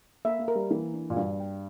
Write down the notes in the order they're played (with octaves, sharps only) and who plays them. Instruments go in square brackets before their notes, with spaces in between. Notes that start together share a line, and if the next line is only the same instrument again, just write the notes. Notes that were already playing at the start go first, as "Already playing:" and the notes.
[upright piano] A#3 [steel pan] E5
[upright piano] A#3
[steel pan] A#4
[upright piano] G3
[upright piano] E3 [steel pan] A#3
[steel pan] D4
[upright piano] A#2
[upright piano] G2 [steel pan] F#4
[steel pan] G5